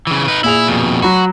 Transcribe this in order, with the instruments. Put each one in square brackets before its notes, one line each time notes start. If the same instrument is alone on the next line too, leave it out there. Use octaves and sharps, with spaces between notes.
[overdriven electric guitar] C#3 E3
D#4 B4
[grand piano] A#2 G#4 F7 [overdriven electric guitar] E4
[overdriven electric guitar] F2 B2
[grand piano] F#3 B5 [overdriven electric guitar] F#4